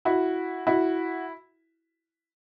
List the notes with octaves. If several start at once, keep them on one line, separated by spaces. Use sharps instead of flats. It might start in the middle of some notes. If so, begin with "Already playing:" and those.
E4 F#4
E4 F#4